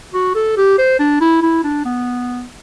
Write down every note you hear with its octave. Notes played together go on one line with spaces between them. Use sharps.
F#4
A4
G4
C5
D4
E4
E4
D4
B3